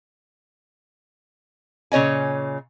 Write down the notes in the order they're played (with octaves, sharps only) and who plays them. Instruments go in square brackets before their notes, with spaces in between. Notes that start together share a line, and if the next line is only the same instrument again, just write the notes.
[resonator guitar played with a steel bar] A#2 C#3 C#5 D#5 G#5